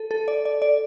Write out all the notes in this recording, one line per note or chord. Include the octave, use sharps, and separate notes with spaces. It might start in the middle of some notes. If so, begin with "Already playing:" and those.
Already playing: A4
A4
D5
D5
D5